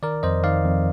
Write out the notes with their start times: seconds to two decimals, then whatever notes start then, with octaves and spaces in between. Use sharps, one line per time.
0.03 D#3 A#4 D5
0.23 F2 C5 D#5
0.44 D#3 D5 F5
0.64 F2